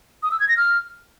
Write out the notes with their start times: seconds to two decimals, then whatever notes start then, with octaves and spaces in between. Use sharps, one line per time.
0.23 D#6
0.31 E6
0.40 G#6
0.49 A#6
0.57 F6